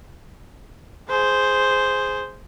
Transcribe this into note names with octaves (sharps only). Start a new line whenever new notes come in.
G#4 C5